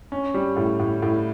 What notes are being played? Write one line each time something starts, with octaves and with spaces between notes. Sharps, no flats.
C#4
G3
A2
A2
A2